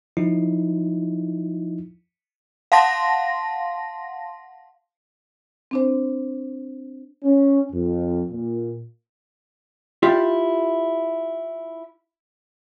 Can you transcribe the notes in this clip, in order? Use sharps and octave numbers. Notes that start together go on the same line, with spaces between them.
F3 D#4 E4
F5 F#5 A5 C6 A#6
C4 D4 C5
C#4
F2
A#2
E4 F4 G4 D5